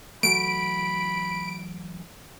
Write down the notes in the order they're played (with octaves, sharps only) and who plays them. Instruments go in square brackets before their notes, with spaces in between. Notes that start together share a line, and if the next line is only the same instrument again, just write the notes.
[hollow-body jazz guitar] E3 F#3 A3 [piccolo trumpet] B5 [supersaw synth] D7